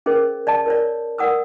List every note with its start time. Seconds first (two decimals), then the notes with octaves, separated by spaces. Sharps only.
0.06 C#4 G#4 A#4 C5 D#5
0.47 D5 D#5 A5
0.66 A#4 C#5 D5
1.18 A#4 D5 F#5 D#6 E6